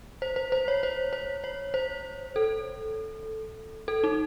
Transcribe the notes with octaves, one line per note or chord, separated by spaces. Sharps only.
C5
C5
C5
C#5
C5
C5
C#5
C5
A4
A4
D#4